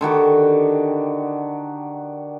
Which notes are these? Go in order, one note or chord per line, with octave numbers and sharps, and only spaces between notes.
D3 D#3 F#4 G4